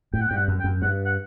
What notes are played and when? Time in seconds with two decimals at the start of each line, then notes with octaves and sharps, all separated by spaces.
0.13 A2 G5
0.21 F#5
0.29 G2 G5
0.36 F#5
0.48 F#2
0.59 G5
0.64 F#2
0.82 G2 F#5
1.05 F#5